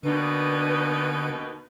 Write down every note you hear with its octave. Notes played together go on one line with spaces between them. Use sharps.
D#2 B2 D3 D4 D#4 B4